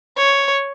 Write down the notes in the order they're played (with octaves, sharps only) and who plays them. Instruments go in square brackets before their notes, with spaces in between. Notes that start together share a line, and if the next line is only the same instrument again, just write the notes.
[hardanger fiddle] C#5